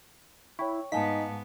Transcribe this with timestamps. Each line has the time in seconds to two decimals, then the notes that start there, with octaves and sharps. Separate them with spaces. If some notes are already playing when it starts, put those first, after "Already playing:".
0.59 E4 C#5 G5 C#6
0.92 G#2 B3 D#4 F5 G#5 A5 B6